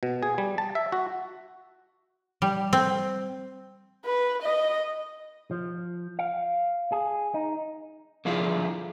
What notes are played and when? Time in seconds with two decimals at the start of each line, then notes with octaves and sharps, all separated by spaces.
0.03 B2
0.23 G#4
0.38 G3
0.58 A5
0.75 E5
0.92 F#4
2.42 G3
2.73 C4
4.06 B4
4.42 D#5
5.51 F3
6.19 F5
6.92 G#4
7.34 D#4
8.25 D3 F3 E4 F4 G#4 F5